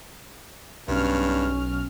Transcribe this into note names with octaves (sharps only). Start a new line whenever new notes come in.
B1 G2 C#4 F6